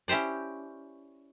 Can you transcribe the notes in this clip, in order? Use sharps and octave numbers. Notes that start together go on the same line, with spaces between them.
C#4 E4 G4 C5 D5